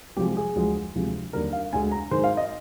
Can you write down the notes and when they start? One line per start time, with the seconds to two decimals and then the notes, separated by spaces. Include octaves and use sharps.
0.17 C2 C3 F3 G#3 G4
0.37 G#4
0.55 D2 D3 F3 G#3
0.95 D2 C3 F3 G#3
1.33 D#2 D3 G3 A#4
1.53 F5
1.72 D2 D3 G#3 G#5
1.92 A#5
2.11 G#2 D#3 G#3 C5
2.24 F5
2.37 D#5